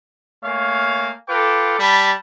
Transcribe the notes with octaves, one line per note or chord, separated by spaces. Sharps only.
A3 A#3 C#5 F5 G#5
F4 A4 B4 G5 D6
G3 A5 B5